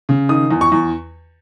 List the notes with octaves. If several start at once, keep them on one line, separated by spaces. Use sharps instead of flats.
C#3
D#3 D#6
E2
C#6
E2